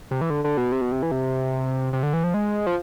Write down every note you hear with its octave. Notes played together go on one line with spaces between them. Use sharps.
C3
E3
D3
D3
B2
C3
B2
C3
E3
C3
C3
D3
E3
F3
G#3
F3